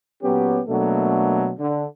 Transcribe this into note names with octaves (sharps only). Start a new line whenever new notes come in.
A#2 F#3 B3 C#4 G4
B2 F#3 A3 A#3 D4 A4
D3